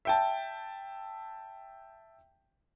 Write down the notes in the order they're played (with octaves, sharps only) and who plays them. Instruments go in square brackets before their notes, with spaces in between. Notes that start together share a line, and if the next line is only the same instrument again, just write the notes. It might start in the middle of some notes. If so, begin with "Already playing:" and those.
[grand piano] E5 G5 A5